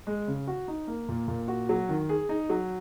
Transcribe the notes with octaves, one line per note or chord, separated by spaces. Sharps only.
G#3
C#3
F#4
D#4
A#3
A#2
A#2
F#4
F#3
D#3
G#4
D#4
F#3